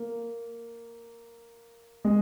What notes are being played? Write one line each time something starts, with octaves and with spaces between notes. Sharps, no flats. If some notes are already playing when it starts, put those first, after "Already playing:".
Already playing: A#3
G#3